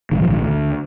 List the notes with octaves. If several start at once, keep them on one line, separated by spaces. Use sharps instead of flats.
A#1 G#2 D#3
F3
D#3
D2 D3